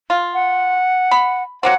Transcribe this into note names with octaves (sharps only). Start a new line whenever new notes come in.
F4
F#5
B5
F#3 A#3 C4 F#5